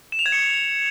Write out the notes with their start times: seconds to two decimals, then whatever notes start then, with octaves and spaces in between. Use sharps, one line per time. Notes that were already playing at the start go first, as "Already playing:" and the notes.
0.12 E7
0.19 F7
0.26 G#6
0.32 C#7